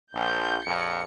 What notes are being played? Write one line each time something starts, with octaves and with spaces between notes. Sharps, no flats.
A#1 G6
A#1 F2 C#7